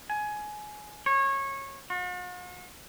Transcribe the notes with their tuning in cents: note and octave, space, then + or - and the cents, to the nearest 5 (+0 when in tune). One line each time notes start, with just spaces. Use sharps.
G#5 +20
C#5 -20
F#4 -45